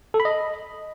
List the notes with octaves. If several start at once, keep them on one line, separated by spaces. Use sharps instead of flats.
A4
B5
D#5